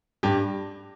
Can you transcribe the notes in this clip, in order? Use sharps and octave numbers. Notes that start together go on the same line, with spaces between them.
G2 G4